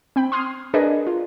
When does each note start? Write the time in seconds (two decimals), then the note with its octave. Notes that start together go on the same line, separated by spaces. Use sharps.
0.16 C4 G5 B5
0.32 C6 D#6 F6 G#6 C7
0.74 D4 G#4 A#4 B4 D5 D#5
1.07 F4